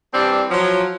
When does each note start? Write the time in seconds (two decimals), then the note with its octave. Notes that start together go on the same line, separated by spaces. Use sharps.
0.14 E3 G3 C4 D4 G5
0.50 F3 F#3